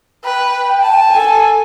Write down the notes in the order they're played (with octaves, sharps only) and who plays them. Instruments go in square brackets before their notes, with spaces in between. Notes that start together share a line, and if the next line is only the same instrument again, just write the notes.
[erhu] B4 [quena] G5
[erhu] A5
[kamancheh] A4 G#5